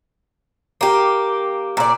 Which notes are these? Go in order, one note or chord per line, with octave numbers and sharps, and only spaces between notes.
A#3 G4
A#2 D5